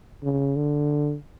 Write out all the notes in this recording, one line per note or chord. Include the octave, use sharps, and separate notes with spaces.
C#3
D3